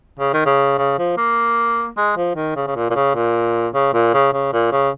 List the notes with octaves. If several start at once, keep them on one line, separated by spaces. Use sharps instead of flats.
C#3
D#3
C#3
C#3
F3
A#3
G#3
F3
D#3
C#3
C#3
A#2
A#2
C#3
A#2
C#3
A#2
C#3
C#3
A#2
C#3